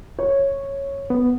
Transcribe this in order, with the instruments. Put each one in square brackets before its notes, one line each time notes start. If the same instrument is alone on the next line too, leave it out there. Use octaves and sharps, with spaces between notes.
[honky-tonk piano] C#5
[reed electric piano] B3